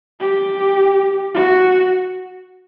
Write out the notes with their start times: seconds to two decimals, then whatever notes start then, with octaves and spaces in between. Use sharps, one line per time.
0.21 G4
1.34 F#4